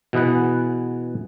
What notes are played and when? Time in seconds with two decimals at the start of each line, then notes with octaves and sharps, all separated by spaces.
0.13 B2 E3 G#4 B4 F#5